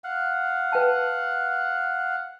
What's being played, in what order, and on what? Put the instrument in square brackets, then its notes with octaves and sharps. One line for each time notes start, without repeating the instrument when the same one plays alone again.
[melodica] F5 F#5
[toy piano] B4 G5 A5